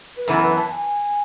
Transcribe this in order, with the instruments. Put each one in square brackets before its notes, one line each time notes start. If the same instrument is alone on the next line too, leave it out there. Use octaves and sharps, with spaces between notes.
[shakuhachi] B4
[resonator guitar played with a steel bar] F#2 E3 B3 [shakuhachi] A4
[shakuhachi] B4
A5
G#5